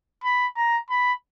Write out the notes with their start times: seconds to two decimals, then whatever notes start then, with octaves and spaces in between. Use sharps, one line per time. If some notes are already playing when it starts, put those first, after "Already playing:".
0.24 B5
0.57 A#5
0.90 B5